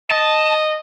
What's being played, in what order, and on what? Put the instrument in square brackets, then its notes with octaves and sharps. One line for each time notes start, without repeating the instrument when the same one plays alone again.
[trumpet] D#5 [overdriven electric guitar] A5